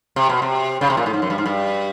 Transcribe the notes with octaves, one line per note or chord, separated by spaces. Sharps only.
C3
B2
C3
C#3
C3
A#2
A2
G#2
F#2
G2
G#2
G2